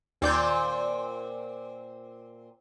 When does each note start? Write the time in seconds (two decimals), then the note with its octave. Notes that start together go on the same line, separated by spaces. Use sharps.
0.22 D#2 A#2 C4 D5 G6